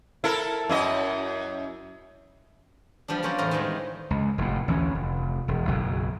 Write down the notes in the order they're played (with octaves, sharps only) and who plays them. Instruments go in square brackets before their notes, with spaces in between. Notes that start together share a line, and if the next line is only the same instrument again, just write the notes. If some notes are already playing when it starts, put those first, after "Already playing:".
[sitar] E4 A4 A#4
F#2 E4 D#5
[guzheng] F3 G3 B3 D4
F#3 A#3 C#4 C5 D5
E2 A2 A#3 C4 A#4 A#5
D#3 E3 G3 G#3 C4
[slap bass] C#2
F1 A2
A1 D2 E3 C#4
F1
E1
F#1 B1 F#3